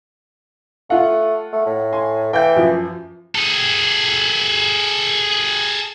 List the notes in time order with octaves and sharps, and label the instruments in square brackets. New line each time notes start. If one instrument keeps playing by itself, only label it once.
[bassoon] A3 [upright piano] F4 F#5
[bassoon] A3
A2
[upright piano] G#5 C6
[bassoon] E3 [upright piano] G5 G6
[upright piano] F#2 F3
[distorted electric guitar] G#4 A4